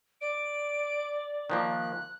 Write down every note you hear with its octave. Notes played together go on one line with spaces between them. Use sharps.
D5 D7
D#3 F3 A#3 F#6